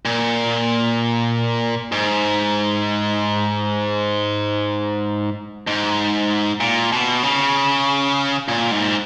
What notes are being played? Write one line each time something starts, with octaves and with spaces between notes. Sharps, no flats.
A#2
G#2
G#2
A#2
B2
C#3
A#2
G#2